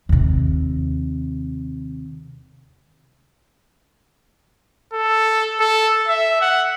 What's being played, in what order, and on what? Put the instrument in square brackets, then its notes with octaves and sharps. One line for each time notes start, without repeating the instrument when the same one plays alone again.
[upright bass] D#2 C3
[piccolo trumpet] A4
A4
E5
F#5